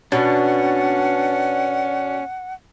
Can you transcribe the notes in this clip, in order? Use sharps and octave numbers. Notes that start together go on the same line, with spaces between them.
B2 C#4 D4 F#5